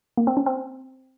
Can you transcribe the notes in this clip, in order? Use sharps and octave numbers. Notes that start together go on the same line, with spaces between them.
A#3
C4
C#4
C4